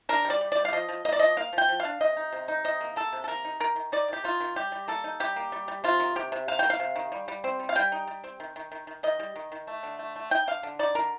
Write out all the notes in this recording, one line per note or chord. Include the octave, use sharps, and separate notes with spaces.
D4 A#4
G3
D5
G3
G3 D5
F5
F3 D#5
F3
A#3 D#5
D5
F3 D#5
A#3 F5
F3
G5
F3
F5
D4
C3 D#5
D#4
C3
D#4
C3 D#5
A#3
A#3 A4
C3
A4
A#3 A#4
D#4
D#3 A#4
D#3
D#4 D5
D#3 G4
D#4 F4
D#3
G3 G4
G3
A#3 A4
D#4
G3 G4
A#3
G3
G3
C3 F4
D#3
C3 G4
C3
C3 F5
A#3 G5
F5
C3
D#3
G3
G3
C4
G3
F5
G3 G5
D#4
G3
C4
D#3
D#3
D#3
D#3
D#3 D#5
G3
D#3
D#3
A3
D3
A3
A3
D#4 G5
D3 F5
D3
D#4 D5
D3 A#4